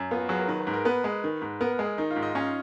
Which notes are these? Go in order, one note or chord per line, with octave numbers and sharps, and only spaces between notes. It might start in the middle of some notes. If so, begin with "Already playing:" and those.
Already playing: F#2
B3 F4
F#4
F#3 G#4
B4
A#4
D#3 B4
B4
G#2
A#4
B3 B4
G#3
D#3
G#2
B3 A#4
A#4
G#3
G#4
D#3 D#4
F4
G#2
D#5
C#4 F5